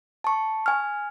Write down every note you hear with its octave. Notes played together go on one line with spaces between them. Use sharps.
A5 C#6
G#5 F6